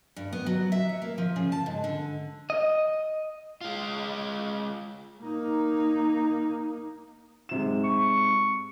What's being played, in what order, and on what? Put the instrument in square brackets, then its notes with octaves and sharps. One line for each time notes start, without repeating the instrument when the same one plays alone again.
[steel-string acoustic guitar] G2
B3
F#3
E5
C#5
A#3
F3
C#3
A5
G#2
D3
[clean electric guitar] D#5
[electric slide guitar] G#3 F4
[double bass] A#3 D#4
[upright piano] G#2 C3 E7
[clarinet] C#6